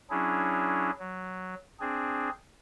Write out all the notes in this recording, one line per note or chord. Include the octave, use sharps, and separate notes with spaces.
F#3 C#4 D4 E4 G#4
F#3
C4 D4 G#4